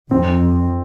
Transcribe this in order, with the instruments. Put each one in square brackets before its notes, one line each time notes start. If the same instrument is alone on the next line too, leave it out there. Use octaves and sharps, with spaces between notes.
[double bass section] F2 [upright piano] C4